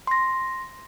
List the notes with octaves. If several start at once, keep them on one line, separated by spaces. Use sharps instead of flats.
C6 A#6